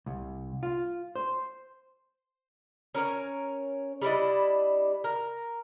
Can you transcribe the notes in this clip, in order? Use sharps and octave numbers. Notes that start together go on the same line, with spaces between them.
C2
F4
C5
C#4 A#4 C5 C#5
G3 D4 E4 D#5
A#4